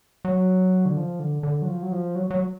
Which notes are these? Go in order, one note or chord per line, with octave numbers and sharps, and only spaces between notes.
F#3
D3
F3
D3
D3
F#3
F3
F#3
F3
F#3
F#3